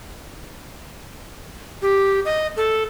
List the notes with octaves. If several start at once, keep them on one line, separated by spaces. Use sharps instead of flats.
G4
D#5
A4